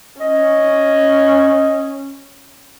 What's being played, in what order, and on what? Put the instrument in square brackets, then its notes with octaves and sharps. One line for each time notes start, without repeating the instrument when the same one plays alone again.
[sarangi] C#4 [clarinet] D#5